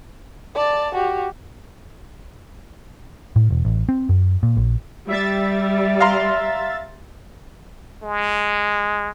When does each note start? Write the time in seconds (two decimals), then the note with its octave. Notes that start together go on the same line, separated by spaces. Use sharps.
0.55 D5 A5
0.94 F#4 G4
3.36 A2
3.50 E1
3.65 A1
3.89 C4
4.09 F#2
4.43 A#2
4.57 A#1
5.08 G3 E5 A6
6.00 F5 A#5 C6
8.03 G#3